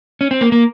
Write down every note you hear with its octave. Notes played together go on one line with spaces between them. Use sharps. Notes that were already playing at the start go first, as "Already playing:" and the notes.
C#4
C4
A#3
A#3